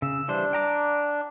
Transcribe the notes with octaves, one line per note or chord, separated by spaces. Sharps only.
C#3 E6
E3 G3 D4 C5
G5 A#5 D6